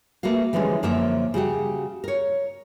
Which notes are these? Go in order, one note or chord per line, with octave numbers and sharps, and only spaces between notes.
A3 A#3 F#4 B4 F5
D3 E3 F3 G3 G#3 C#4
F#2 D3 F3 A#3 C#5 E5
C#3 G3 F#4 G4
A#4 C#5